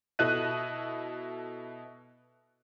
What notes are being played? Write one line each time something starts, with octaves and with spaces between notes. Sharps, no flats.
B2 E4 A4 D#5 F#6 D#7